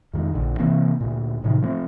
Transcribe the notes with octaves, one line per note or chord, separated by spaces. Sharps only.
F2 D#3 G#3
A#1 D3
C3 E3 A#3 C4
D2 A#2
A2 C3 D#3 F3
F3 A3 C4